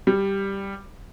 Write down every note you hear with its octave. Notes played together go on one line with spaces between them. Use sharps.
G3